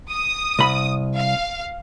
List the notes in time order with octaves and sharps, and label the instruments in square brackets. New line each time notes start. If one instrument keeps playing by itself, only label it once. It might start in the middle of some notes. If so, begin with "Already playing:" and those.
[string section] D#6
[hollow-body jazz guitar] C2 B5
[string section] F5